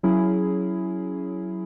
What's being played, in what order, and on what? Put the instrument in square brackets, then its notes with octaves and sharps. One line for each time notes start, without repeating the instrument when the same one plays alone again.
[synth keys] F#3 C#4 E4 G#4